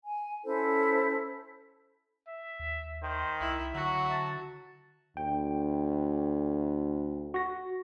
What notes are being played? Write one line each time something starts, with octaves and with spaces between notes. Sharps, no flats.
G#5
C#4 E4 A4 C5
E5
D#2
D#3 C5
C2 E4 E5
D3 F#3 F#4
A5
D2 G5
F#4 A#6